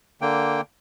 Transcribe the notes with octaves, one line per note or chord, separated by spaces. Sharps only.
D3 A#3 G5